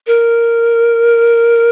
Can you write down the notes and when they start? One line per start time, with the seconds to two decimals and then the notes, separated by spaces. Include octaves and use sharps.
0.07 A#4